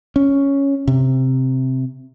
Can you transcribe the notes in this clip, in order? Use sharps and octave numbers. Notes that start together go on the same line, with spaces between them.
C#4
C3